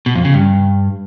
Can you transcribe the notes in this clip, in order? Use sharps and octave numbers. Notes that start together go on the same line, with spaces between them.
B2
F2
C#3
G2